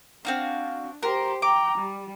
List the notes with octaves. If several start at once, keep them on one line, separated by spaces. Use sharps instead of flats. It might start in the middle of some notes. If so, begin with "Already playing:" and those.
C4 D4 F#4 F5
G4 A#4 C5
G5 A#5 D6
G3